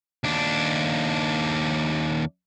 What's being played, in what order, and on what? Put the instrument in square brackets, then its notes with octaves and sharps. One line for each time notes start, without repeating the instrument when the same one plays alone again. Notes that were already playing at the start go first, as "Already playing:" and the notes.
[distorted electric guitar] D#2 D4